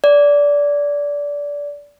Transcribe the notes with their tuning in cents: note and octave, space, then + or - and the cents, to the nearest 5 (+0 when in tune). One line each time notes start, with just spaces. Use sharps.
D5 -20